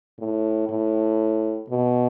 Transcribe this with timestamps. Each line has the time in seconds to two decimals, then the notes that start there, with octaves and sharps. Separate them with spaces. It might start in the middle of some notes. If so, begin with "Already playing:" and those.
0.19 A2
0.69 A2
1.70 B2